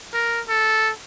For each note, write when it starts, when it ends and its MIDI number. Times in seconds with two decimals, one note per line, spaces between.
0.14 0.41 70
0.49 0.92 69